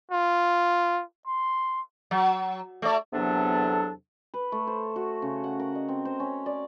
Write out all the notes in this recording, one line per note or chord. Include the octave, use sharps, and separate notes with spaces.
F4
C6
F#3
A3 D5
E2 C3 F#3 B3 D4 A4
B4
A3
C5
F#4
C#3
F#5
A#4
D#5
C4
C5
C#4
D5